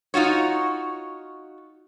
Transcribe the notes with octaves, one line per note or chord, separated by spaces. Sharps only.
D#4 F4 F#4 C#5